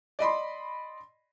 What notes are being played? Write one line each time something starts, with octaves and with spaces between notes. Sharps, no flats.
D5 D#5 B5 C6